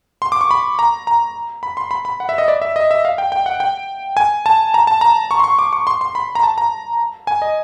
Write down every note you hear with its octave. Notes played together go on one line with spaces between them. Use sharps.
C6
D6
C#6
B5
A#5
A#5
B5
C6
B5
B5
F#5
E5
D#5
D5
E5
D#5
E5
F5
G5
G5
F#5
G5
G#5
A5
A#5
A5
A#5
C#6
C6
C#6
D6
C#6
C6
C6
B5
A#5
A5
A#5
G#5
D#5